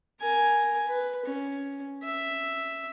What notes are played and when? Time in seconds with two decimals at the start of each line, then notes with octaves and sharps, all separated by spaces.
0.21 A#4 G#5
0.88 B4
1.25 C#4
2.03 E5